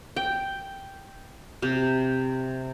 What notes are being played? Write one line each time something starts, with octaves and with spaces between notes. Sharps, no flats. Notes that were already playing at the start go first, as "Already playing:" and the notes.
G5
C3